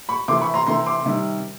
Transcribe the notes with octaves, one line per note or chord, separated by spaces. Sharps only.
B5 C#6
C3 E3 A3 C6 D6
B5 C#6
A#5 C6
C3 E3 A3 A#5 C6
C6 D6
C3 D#3 G3